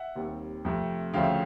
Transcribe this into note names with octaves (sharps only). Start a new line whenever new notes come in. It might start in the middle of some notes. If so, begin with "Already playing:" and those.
Already playing: E5 F#5
D#2 D#3 G3 C4
F2 C3 F3 A3
D2 C#3 F3 A3 F5 G5